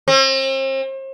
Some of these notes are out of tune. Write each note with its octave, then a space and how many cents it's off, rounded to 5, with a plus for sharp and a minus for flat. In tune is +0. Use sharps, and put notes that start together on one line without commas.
C4 +40